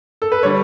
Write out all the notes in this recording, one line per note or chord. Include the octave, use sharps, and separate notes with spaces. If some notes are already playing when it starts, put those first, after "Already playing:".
A4
B4
D3 G3 C#5